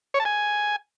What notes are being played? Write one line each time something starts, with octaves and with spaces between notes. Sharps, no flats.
C#5
A5
G#5